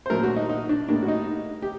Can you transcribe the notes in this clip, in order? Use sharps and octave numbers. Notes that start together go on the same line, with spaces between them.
C5
A#2 F#3 A3 A#4
F#4
D#4
D#4
D4
A2 G3 A#3 D4
F#4
D#4
G4